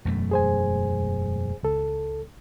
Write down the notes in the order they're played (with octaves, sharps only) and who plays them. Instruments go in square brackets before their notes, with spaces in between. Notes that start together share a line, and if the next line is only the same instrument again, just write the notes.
[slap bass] E1 F#2 A3
[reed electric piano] G#4 C5 G#5
C#2 A4